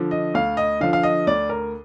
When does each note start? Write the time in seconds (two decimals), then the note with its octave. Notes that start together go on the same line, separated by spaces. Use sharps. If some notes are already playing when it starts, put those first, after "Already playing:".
Already playing: D3 F3
0.11 D#5
0.34 D2 F5
0.57 D#5
0.81 D3 F3 F5
0.93 F5
1.03 D#5
1.27 D2 D5
1.49 A#4